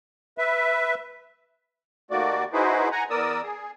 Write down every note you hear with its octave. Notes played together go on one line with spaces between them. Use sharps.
B4 E5
D#2 D#3 A3 A#3 F#4 D5
D#4 E4 F#4 G#4 B4 C5
F#5 G#5 A#5
E2 B3 A#4 D5 D#6 E6
G#4